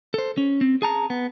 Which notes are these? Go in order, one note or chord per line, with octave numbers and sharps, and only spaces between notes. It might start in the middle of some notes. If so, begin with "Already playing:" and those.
A4 C5
C#4
C4
G#4 A5 A#5
B3